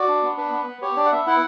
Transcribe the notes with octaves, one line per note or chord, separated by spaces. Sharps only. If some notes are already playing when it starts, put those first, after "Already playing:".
Already playing: F#4 D5
D4
B3
D4 B4
B3
B3
G4 C#5
D4 D5
F#5
B3 E5
E4 F#5